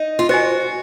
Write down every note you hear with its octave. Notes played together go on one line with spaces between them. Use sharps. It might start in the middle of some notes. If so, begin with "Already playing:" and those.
Already playing: D#4
F4
F#4 C5 D#5 G#5